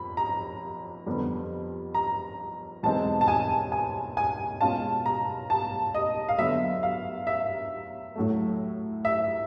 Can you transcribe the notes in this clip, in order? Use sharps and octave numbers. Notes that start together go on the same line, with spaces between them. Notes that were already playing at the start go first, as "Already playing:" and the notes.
Already playing: F2 B5
A#5
F2 D3 G3 B3
A#5
E2 B2 G#3 C4 D#4 A5
A5
G#5
G#5
G#5
B2 G#3 C#4 F4 A5
A#5
A5
D#5
F5
D3 F#3 B3 E5
F5
E5
A2 F#3 A3
E5